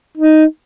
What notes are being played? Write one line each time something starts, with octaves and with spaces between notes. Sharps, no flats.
D#4